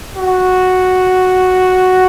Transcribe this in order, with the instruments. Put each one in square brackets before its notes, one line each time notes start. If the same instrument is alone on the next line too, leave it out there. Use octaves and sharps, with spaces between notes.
[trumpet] F#4